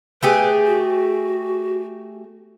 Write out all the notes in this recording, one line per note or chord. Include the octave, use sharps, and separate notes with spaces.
A3 G4 G#4 B4
F#4